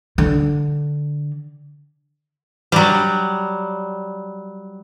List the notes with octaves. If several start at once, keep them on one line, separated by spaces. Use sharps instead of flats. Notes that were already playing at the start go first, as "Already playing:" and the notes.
D3
F#3 G3